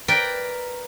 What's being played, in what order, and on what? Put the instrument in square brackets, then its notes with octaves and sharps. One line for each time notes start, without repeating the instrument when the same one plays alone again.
[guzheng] A#4 B4 D5 G5